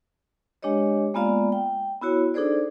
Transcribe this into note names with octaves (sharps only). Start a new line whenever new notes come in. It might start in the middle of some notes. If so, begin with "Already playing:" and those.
G#3 D4 G4 C#5 D#5
G#3 A#3 B3 F4 D5 F5
G5
B3 E4 F#4 C#5
D4 D#4 G#4 A4 C5 D5